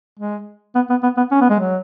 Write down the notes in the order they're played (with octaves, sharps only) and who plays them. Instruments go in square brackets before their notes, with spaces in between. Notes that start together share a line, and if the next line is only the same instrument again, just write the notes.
[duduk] G#3
B3
B3
B3
B3
C#4
B3
G#3
F#3